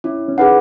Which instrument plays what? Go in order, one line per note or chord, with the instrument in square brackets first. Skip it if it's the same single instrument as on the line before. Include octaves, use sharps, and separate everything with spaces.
[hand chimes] C#4 [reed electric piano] E4
[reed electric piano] C#4
[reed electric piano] D#4 [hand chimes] G#4 B4 F#5